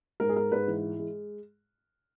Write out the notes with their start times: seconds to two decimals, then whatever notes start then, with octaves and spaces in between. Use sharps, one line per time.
0.20 G#2 A#4
0.29 G#4
0.36 G#3 A#4
0.52 G#2 B4
0.68 E3
0.83 G#3
0.99 G#3